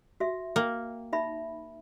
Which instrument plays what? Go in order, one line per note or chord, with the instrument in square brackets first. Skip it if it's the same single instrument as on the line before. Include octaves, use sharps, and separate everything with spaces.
[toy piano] F#4 E5
[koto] A#3 [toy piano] G5
[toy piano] D#4 E5 B5